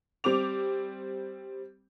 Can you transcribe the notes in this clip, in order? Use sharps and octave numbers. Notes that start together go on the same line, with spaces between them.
G3 C4 D6 F7